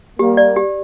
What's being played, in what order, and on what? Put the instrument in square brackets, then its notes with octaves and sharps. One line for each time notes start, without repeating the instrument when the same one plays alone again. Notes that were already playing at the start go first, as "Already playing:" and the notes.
[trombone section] G3 A#3 [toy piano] G4
[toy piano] D5
G4